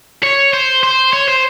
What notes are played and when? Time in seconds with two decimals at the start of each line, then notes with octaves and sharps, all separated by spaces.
0.23 C#5
0.53 C5
0.83 C5
1.13 C#5
1.28 C5